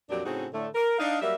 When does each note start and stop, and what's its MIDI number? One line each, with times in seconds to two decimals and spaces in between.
0.10 0.23 41
0.10 0.23 46
0.10 0.23 54
0.10 0.23 62
0.10 0.23 67
0.10 0.23 74
0.24 0.47 45
0.24 0.47 49
0.24 0.47 60
0.24 0.47 63
0.24 0.47 66
0.24 0.47 68
0.53 0.67 45
0.53 0.67 50
0.53 0.67 57
0.75 0.97 70
0.99 1.19 62
0.99 1.19 63
0.99 1.19 77
1.21 1.35 54
1.21 1.35 55
1.21 1.35 58
1.21 1.35 76